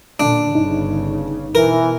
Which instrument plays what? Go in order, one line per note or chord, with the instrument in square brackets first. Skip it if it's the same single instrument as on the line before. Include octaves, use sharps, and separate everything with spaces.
[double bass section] A#2 D3 [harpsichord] D4
[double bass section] G1 G2 C#3 [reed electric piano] D#4
[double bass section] B2 [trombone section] E3 [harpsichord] A#4